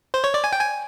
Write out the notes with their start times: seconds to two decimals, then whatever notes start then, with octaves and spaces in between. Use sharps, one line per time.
0.14 C5
0.24 C#5
0.34 D5
0.44 G#5
0.53 G5
0.61 G#5